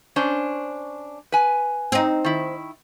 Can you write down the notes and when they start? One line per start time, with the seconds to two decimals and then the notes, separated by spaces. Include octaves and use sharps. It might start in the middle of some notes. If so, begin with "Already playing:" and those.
0.16 C#4 D4 C5
1.32 B4 G#5
1.92 C4 D#4
2.24 D#3 E4